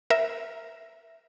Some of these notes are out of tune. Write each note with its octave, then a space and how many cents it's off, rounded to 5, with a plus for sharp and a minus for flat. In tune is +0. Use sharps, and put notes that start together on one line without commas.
A#4 +0 E5 +0